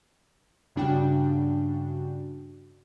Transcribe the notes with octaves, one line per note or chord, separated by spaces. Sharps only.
G2 C#3 D4 F#4 G5